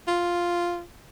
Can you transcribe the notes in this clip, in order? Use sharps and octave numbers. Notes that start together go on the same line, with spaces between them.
F4